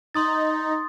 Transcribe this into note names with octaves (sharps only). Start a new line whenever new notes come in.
D#4 C6 D#6 A6